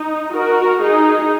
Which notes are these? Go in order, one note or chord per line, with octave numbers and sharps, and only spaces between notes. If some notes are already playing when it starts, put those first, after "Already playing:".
Already playing: D#4
F#4 A#4
D#4 G#4